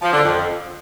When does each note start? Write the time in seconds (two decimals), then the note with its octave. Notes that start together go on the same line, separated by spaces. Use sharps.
0.02 F3
0.13 D3
0.24 F2